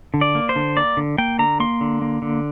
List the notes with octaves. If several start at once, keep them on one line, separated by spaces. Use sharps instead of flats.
D3
D5
A#3
C5
D3
A#3 D5
D3
A#3 G5
D3 A#5
A#3 C6
D3
A#3
D3